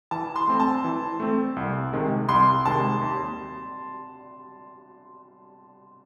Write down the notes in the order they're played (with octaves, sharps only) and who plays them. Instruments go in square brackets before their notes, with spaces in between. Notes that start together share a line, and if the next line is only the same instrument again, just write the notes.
[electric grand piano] E3 [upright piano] A5
[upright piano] C6
[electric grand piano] A3 C4
[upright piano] A5
[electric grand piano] E3
A3 C4
C2
C3 D#3 G#3
[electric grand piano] C2 [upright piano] C6
[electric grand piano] C3 D#3 G#3 [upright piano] A5
[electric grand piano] D#2